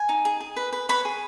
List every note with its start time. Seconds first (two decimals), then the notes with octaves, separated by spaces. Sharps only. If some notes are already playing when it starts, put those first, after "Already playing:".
Already playing: G#5
0.09 D#4
0.25 G#4
0.40 G#4
0.56 B4
0.73 B4
0.89 B4 C#5 B5
1.05 G#4